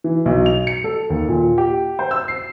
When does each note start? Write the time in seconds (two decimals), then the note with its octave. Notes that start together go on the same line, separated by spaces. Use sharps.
0.04 E3
0.26 B1
0.46 F7
0.67 C#7
0.84 A4
1.10 D#2
1.28 A#2
1.58 G4
1.99 C5
2.11 E6
2.28 C7